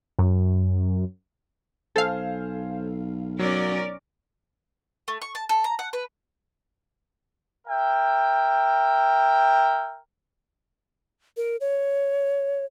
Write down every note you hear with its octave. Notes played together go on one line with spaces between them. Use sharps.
F#2
B1 A4 C5 F5 G#5
F#3 C#4 A#4 D5
A3
C#6
A5
A4
A#5
F#5
B4
A#4 E5 G5
A#4
C#5